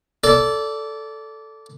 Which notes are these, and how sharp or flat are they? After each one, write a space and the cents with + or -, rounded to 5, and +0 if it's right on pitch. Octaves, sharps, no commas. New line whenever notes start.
A4 +0 D5 -20